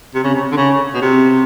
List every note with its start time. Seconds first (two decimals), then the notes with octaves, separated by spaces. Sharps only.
0.14 C3
0.24 C#3
0.34 C3
0.52 D3
0.57 C#3
0.94 B2
1.02 C3